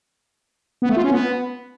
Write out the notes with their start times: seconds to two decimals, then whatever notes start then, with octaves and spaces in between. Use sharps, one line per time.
0.82 B3
0.89 A3
0.97 F4
1.04 C#4
1.11 B3